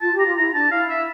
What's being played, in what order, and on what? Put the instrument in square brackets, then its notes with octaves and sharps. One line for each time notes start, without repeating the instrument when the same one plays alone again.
[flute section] F4 [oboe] A5
[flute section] G4
[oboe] A#5
[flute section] F4
[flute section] E4 [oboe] A#5
[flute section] D4 [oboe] A5
[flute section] E4 [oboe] F5
[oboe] E5